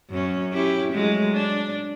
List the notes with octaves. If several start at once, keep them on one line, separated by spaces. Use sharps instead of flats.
F#2 C#4
C#4 E4 G4
F#3 G#3 A3
D4